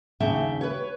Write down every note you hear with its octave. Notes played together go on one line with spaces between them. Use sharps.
D#2 C#3 C#4 E5 G5 A5
B4 C#5